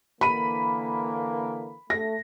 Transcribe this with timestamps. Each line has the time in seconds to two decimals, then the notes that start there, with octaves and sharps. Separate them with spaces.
0.21 D3 E3 A#3 B5 D#7
1.90 A3 A#6